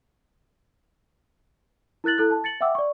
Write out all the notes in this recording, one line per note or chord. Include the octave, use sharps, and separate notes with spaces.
E4 A#4 F#6 A6 F#7
E4 A4 F#6
A5
A6 C#7 F#7
E5 F#5 G5 D6 E6
D5 C#6